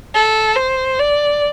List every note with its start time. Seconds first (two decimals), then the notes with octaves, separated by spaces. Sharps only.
0.15 A4
0.56 C5
0.99 D5